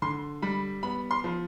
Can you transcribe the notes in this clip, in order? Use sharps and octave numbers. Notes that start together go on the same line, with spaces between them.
D3 C6
G3 B5
B3 B5
C6
F3